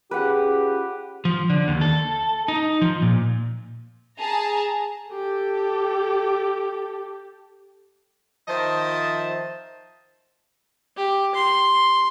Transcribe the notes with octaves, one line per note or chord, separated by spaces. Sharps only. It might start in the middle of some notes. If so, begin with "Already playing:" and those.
C#4 F4 G4 G#4 B4 F#5
F3
D3
D#2
A4
D#4
F3
A#2
G#4 A5 A#5
G4 A4
D#3 F3 C5 D#5 E5 A5
G4
C6